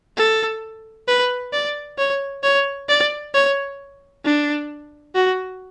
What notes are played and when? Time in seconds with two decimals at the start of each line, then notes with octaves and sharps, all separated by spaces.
0.17 A4
1.08 B4
1.53 D5
1.98 C#5
2.43 C#5
2.89 D5
3.34 C#5
4.25 D4
5.15 F#4